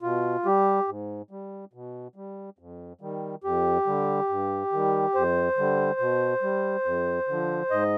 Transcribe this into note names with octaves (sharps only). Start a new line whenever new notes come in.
B2 F4
G3 G4
G#2
G3
B2
G3
F2
D#3 G3
F2 G4
D3 G3
G2
D#3 G3
F2 C5
D3 G3
B2
G3
F2
D3 F3
G#2 D#5